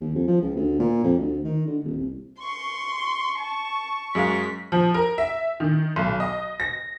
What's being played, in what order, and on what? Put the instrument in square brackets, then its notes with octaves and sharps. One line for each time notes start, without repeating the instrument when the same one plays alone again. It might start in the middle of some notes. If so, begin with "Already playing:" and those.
[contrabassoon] D#2
F2
F3
C#2
D2
A#2
F2
D2
D#3
D3
D#1
C2
[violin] C6 [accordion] C#6
[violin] A5
[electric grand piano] F#2 G#3 F5 [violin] B6
[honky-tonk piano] F3
A#4
E5
D#3
B1
D#5
A#6